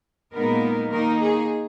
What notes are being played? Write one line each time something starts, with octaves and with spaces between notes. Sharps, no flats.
A#2 G#3 B3 D#4 A#4
D#3 A#3 D#4 A#4
G#4